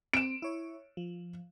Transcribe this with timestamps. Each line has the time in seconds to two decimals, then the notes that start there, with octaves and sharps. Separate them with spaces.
0.13 C4 D7 E7
0.42 E4 C#5
0.97 F3